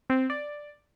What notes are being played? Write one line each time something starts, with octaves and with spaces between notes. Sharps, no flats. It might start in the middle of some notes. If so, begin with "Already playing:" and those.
C4
D5